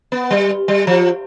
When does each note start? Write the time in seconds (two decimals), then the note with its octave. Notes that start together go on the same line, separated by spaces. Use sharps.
0.12 B3
0.31 G3
0.68 G3
0.87 F3